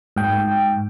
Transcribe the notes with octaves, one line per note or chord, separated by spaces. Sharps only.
G#2 G5